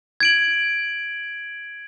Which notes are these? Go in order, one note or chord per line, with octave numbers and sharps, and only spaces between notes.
G#6 D7 F#7